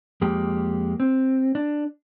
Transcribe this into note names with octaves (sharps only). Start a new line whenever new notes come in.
F2 G#3 A#3 G4
C4
D4